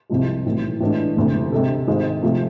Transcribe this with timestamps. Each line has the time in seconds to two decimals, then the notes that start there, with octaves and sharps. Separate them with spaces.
0.10 C2 C3 F3 G#3
0.46 B1 A2 E3
0.80 A2 E3 G#3 D4
1.16 E1 D2 C3
1.52 C3 G#3 D4 A4
1.87 G#1 G#2 G#3 C4
2.23 C3 F3 A3